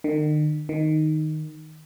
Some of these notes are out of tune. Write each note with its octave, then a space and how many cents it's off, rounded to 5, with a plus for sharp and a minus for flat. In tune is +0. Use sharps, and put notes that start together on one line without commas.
D#3 -45
D#3 -5